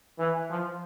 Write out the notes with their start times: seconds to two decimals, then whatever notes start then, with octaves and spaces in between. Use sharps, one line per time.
0.18 E3
0.49 F3